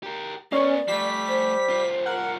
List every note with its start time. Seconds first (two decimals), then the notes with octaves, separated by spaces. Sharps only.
0.03 G4 A#4
0.52 A#3 B3 C#4 D5
0.88 F3 G3 A3 G4 B6
1.28 C5
1.69 C2 F4
2.06 A#4 F#5